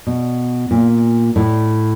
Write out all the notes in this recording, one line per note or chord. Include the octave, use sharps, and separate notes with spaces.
B2
A#2
A2